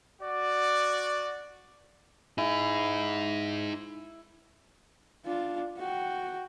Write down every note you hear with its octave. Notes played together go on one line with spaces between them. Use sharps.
F#4 D5
D#4 E4 G#4
D4 F4
F#4 G5